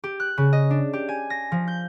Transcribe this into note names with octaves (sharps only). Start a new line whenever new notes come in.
G4
F#6
C#3
D#5
D4
G4
G#5
A#6
F3
G6